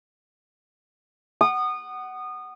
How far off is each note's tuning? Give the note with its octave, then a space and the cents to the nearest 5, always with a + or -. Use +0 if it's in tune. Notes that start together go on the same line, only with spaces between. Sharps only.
F#5 +15 D#6 -25